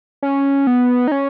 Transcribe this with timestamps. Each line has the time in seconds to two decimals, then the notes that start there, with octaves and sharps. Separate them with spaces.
0.23 C#4
0.67 B3
1.08 D#4
1.12 C#4